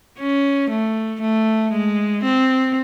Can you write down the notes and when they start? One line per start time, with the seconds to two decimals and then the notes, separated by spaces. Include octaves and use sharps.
0.19 C#4
0.70 A3
1.21 A3
1.72 G#3
2.24 C4